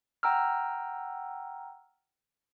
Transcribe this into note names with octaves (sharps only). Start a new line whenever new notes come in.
F#5 G5 A#5 E6 F6